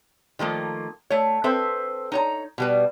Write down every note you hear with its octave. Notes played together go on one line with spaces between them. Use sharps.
D#3 F3 A3 A#3
A3 C#5
C4 A4 B4 C5 E5
D#4 C#5 A#5
B2 G3 B4